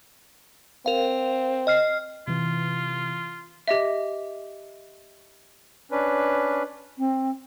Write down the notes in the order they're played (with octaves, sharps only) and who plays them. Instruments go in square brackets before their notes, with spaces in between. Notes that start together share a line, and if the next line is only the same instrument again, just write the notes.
[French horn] C4 [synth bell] A#4 F5
[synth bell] D#5 F6 C7
[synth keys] C3 E3 [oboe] F4
[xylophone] G4 D#5 E5
[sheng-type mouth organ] C#4 D4 B4
[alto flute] C4